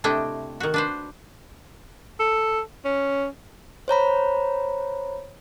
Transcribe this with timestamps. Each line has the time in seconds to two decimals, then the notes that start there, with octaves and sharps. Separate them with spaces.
0.04 C3 A3 D4 E4 D#5 G5
0.60 D#3 F#4
0.74 D4 B4 C5
2.20 A4
2.85 C#4
3.88 C5 C#5 A#5 B5